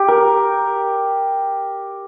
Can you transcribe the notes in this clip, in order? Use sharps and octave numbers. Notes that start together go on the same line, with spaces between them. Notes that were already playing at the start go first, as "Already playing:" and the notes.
Already playing: G4
A#4